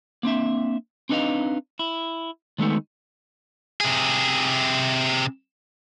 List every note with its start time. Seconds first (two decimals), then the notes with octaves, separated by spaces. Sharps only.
0.23 A#3 C4 D4 E5
1.09 C4 D4 D#4 B4 D#5 F5
1.79 E4
2.58 D#3 G#3 A3 B3 D#4
3.81 C3 G#4